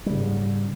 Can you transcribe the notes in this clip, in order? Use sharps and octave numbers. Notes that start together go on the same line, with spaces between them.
G#2 C#3 G3